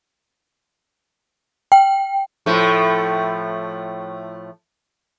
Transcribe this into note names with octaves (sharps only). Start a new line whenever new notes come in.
G5
A2 F3 A3